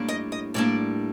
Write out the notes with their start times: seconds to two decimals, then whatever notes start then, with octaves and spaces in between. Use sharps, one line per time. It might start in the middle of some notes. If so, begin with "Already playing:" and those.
Already playing: A2 G3 A#3 D4
0.08 D#5
0.32 D#5
0.54 A2 G3 A#3 D4 D5